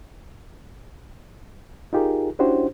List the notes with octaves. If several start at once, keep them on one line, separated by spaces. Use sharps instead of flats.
D#4 F4 G4 G#4 A#4
C#4 D4 E4 F#4 G4 C5